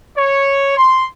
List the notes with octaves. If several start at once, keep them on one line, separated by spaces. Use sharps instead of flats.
C#5
C6